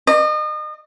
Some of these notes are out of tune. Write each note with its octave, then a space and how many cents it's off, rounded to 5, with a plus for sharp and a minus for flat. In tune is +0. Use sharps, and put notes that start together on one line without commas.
D#5 -35